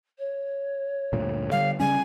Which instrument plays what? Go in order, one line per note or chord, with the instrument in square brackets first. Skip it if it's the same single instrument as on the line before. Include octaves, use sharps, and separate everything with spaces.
[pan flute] C#5
[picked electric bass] D2 G2 A#2
[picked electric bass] D3 G3 [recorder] F5
[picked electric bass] C#3 G3 C#4 [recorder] G#5